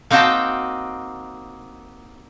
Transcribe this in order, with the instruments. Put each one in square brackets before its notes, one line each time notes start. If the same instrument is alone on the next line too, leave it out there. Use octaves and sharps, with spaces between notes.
[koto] A#3 C4 D#4 F#4 G5 A5